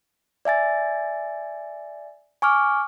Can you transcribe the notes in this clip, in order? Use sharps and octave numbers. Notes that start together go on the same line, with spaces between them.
D5 E5 G#5 A6
G#5 C#6 D6 F6